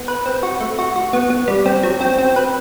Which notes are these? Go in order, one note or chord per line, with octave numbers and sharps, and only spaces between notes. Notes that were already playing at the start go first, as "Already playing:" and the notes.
Already playing: B3
B4
C4
F#4
A3
F#4
F#4
B3
B3
G3
C4
F#3
C4
C4
B4